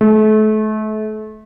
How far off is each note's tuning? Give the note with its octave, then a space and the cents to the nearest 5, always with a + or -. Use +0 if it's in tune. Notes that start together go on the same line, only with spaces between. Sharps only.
A3 -35